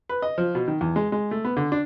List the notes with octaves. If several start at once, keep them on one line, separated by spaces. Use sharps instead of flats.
B4
D#5
F3
B2
D#3
E2
G#3
G#3
A3
B3
D3
D4